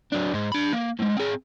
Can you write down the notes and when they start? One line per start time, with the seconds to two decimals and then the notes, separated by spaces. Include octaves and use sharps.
0.12 F#3 D4
0.33 G#2 G#3
0.52 D4 B5
0.73 A#3
0.99 A2 G#3
1.17 C4 G#4